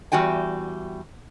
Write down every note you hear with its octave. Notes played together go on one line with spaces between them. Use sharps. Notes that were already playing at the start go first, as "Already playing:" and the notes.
E2 G3 F#4 G5 G#5